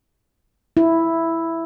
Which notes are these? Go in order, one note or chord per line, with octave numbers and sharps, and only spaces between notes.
E4